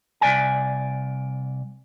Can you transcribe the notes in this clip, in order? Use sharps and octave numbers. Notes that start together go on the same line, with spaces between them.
C2 D5 G#5